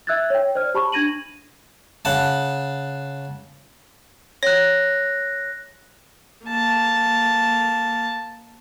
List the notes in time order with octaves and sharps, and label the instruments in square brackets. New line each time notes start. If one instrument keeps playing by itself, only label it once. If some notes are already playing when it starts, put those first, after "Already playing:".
[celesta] E5 E6 F#6 G#6 A6
C#5 G5
C5 D5 F6
G4 A5 B5 C#6
D4 G#6 A#6 D#7 F#7
[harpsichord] C#3 F#5 A5
[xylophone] C#5 [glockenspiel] F#6 A#6
[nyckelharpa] A#3 A5